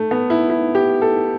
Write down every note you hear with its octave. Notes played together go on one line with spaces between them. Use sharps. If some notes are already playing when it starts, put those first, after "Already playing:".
Already playing: A3
B3
E4
E4
G4
A4